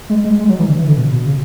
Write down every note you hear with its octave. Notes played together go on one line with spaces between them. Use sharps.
G#3
G#3
G#3
F#3
E3
D3
E3
D3
B2
B2
C#3